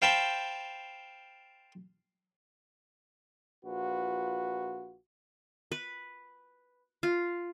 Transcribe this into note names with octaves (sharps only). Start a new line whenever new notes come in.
C5 F5 G5 A5 B5 C#6
A#1 F4 F#4 B4
B4
F4